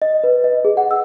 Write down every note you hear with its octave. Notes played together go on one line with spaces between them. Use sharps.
D#5
B4
D#5
G#4
F#5
E6